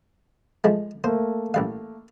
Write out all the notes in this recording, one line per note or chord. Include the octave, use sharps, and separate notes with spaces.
F3 G#3 A3
A3 A#3 C5
A1 G3 F5